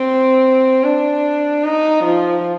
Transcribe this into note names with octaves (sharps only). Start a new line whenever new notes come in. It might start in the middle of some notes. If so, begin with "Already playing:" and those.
Already playing: C4
D4
D#4
F3